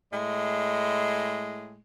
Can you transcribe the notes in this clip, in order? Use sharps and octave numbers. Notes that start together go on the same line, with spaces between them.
A2 G#3